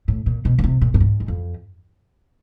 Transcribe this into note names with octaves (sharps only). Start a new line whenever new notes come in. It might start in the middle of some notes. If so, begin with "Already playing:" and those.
A2
A#2
B2
C#3
C3
A#2
A2
G#2
F#2
F2